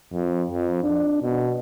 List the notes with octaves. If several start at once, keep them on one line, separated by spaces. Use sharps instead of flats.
F2
F2
D4
B2